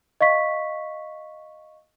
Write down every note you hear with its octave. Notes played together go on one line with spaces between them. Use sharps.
D#5 F5 C#6 B6